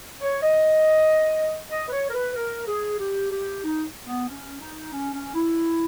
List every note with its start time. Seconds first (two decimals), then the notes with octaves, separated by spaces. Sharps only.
0.22 C#5
0.43 D#5
1.71 D#5
1.88 B4
1.92 C#5
2.10 A#4
2.14 B4
2.35 A#4
2.68 G#4
2.99 G4
3.32 G4
3.64 D#4
4.07 B3
4.28 C#4
4.60 D#4
4.93 C#4
5.14 C#4
5.35 E4